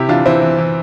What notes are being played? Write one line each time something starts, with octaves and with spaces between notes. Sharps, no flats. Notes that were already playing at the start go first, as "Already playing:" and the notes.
Already playing: C3 E4 G4
E3 D4 F4
E3 C4 E4
E3
E3